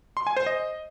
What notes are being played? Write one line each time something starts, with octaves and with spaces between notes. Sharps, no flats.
C6
G#5
C5
D#5